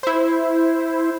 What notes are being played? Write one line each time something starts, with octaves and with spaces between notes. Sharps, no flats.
E4 C5